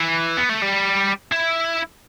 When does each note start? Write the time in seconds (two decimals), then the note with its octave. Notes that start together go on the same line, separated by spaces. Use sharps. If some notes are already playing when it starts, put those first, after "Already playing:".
Already playing: E3
0.37 B3
0.50 A3
0.62 G3
1.32 E4